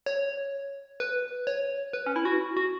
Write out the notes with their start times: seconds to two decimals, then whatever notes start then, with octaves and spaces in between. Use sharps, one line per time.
0.06 C#5
1.00 B4
1.47 C#5
1.93 B4
2.06 C#4
2.16 E4
2.25 F#4
2.57 F#4